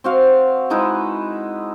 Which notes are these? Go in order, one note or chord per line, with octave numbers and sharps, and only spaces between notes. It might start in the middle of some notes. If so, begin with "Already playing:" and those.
C4 F#4 F5
G#3 D#4 E4 B4